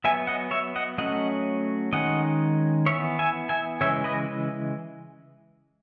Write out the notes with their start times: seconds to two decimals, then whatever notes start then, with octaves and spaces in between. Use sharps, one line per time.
0.04 F#3 B3 E5 G#5
0.27 D#5 F#5
0.51 C#5 E5
0.76 D#5 F#5
0.98 F#3 A3 C#4 D#5 F#5
1.93 D#3 G#3 C#4 D#5 F#5
2.86 E3 B3 C#5 E5
3.19 E5 G#5
3.49 E5 G#5
3.81 C#3 E3 G#3 C#5 E5
4.04 B4 D#5